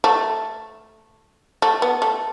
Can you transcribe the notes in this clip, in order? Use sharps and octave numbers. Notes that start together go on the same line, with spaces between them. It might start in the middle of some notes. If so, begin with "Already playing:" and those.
A3
A3
B3
A3